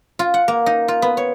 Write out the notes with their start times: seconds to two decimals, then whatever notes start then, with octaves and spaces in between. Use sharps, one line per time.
0.19 F4
0.34 F#5
0.48 A#3
0.66 D#4
0.88 F4
1.02 B3
1.17 C#5